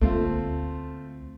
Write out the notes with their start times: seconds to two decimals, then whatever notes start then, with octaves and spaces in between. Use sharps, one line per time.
0.01 D2 A3 C4 F4